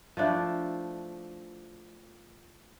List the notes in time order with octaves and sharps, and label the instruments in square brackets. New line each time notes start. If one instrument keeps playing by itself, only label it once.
[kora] F3 A3 D4 E4